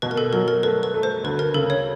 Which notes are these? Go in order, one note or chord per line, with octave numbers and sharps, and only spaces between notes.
B2 B4
A#4
A4
F#3 A#4
A#4
A3 B4
B4
A3
C5
D2 B4
A#4
C#3 A4
C#5